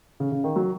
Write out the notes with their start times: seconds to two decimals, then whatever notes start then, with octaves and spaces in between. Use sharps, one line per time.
0.20 C#3
0.32 C#3
0.44 D#3
0.56 F#3